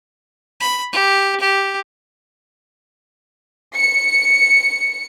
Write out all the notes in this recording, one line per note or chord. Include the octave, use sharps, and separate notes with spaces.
B5
G4
G4
C#7